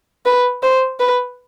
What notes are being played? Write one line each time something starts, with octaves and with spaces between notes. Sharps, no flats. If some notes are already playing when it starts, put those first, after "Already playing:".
B4
C5
B4